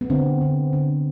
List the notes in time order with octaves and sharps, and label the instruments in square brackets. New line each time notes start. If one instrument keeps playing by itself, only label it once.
[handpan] B3
D3 C4
D3
D3